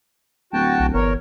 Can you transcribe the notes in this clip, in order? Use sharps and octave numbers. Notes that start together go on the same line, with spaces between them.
D1 F#4 G5 A5
B1
G1 E2 A#4 C#5